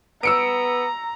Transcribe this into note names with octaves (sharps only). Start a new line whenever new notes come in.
B3 A#5 E6 C#7 D7